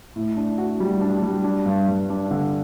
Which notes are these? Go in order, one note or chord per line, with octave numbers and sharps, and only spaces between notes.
A2
D4
F#4
G3
D4
G3
D4
G2
G2
D4
D3